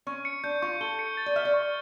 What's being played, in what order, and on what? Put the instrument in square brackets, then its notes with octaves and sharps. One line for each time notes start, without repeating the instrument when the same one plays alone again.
[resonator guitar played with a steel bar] C#4 [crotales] C#6
[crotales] C#7
[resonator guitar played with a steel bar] D4 [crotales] G6
[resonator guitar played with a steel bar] F4 [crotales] C#6
[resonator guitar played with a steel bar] A4 [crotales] G7
[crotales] C#7
A6
[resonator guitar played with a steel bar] D5
[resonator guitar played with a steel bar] E5 [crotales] F6
[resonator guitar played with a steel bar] D5
[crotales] C#6